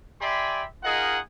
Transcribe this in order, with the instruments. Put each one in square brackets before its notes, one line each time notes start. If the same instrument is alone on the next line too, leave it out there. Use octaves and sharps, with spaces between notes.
[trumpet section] G4 D5 E5 G#5 B5 C6
D#4 F4 G#4 A#4 D#5 F#5